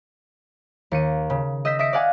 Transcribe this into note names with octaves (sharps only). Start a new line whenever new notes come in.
D#2 C#7 D#7
C#3
D#5 E6 G6 A#6 B6 D#7
E5 D#6 A#6 B6 C#7 D7
D5 F5 F#5 G#5 D6